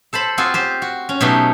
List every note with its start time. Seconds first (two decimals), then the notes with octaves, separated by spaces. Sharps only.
0.13 A4 C5 A5 B5
0.38 C4 F4 F#4 G#4
0.54 C4 G4 C5
0.82 F#4
1.09 C#4
1.21 B2 F#3 A3 D#4 G4